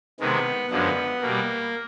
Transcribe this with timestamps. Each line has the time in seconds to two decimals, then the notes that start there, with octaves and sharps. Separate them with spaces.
0.20 C3 D#3 G#3 B3
0.70 F#2 D3 F3 G#3 B3
1.21 B2 A#3
1.27 G3